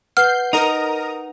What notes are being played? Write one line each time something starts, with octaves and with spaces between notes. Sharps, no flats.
B4 F#5 F6 G6 C7
D#4 A#4 A#5 D#6